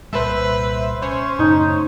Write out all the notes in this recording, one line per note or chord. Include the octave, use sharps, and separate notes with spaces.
C2 A#2 G3 B4 C5 E5
C#4 C5 C#5
F#2 A2 C#3 D#4